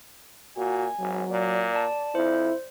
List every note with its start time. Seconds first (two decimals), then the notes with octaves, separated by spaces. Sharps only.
0.57 A#2 F#4 G#5
0.99 G#1 F#3
1.30 A#2 D5
1.76 A5
2.15 F2 E4 C5